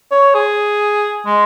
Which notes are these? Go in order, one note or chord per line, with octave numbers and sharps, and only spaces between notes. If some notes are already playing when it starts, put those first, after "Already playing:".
C#5
G#4
G#3